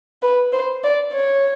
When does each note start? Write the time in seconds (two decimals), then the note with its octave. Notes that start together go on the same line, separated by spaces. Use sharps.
0.22 B4
0.52 C5
0.84 D5
1.13 C#5